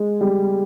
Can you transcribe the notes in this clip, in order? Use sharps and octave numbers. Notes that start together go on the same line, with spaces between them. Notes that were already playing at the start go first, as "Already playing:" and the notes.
Already playing: G#3
G3